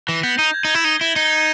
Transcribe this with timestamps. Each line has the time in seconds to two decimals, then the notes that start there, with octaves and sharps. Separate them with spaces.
0.08 E3 A#6
0.23 B3 G6
0.39 D#4 G6
0.54 G#6
0.65 D#4
0.70 E4 G#6
0.84 D#4 G7
1.00 E4 G7
1.15 D#4 C#7
1.31 G7